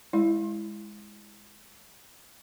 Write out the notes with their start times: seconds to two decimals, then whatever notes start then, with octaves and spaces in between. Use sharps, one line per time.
0.13 G#3 E4